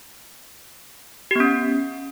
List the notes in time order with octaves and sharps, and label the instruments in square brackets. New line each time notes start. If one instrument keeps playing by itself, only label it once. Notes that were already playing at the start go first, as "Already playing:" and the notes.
[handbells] G4
B3
C#4